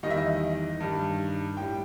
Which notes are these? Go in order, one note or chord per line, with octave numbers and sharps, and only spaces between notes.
E2 D#3 G3 D#5
E5
D#5
G2 D#3 G3
A2 G3 G5